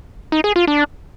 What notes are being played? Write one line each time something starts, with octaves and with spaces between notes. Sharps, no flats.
D#4
G#4
F4
D4